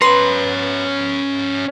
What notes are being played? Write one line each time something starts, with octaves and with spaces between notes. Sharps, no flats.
B3 C#4 B4 A#5 C6